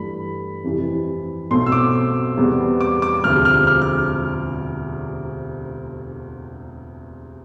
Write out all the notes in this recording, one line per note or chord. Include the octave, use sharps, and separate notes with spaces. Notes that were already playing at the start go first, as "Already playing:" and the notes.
Already playing: G2 E3 A3 B5
F2 C3 E3
B1 B2 A3 C4 C6
E6
D6
E2 C3 G3 B3
D6
D6
E1 D2 C3 F3 C4 F6
F6
F6
F6